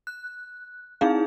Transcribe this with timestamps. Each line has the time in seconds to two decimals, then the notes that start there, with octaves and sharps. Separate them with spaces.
0.07 F#6
1.01 C4 D#4 E4 G#4 F5